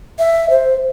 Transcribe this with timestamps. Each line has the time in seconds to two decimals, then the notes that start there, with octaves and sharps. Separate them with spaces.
0.19 E5
0.50 C5